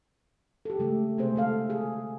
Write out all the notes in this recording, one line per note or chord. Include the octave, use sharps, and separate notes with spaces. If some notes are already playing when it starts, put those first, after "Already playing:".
G4 A4
C#3 G#3 A3
C3 G#3 A3 C4 G#4 C5
D3 G#3 A4 F5
G#4